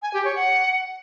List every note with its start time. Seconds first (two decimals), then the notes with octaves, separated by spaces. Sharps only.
0.02 G#5
0.13 G4
0.25 C#5
0.36 F#5